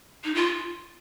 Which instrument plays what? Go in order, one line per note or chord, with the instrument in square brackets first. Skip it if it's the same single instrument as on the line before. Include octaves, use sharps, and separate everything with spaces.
[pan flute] D#4
F4